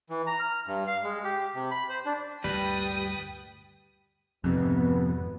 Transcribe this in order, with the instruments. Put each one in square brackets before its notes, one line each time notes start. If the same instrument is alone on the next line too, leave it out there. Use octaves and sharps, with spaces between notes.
[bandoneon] E3
A#5
F6
G2
F5
G#3
G4
C3
B5
C5
D4
[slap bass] D2 G2 A#2 [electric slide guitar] G3 [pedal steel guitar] B4 [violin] G5 D#6
[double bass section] G#1 B3 [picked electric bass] F2 C3